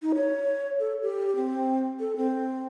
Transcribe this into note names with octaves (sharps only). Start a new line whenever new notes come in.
D#4
C#5
A4
G4
C4
A4
C4